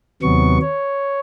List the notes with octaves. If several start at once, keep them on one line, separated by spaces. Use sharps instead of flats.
D#2 C3 F#3 B3 C#6
C#5